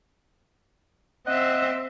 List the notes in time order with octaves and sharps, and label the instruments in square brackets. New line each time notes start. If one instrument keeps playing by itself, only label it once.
[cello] C4 E5 [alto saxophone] D#5 [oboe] F#5